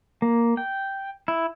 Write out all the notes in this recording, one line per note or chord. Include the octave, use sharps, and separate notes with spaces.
A#3
G5
E4